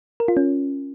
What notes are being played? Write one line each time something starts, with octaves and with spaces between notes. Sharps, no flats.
A#4
F4
C#4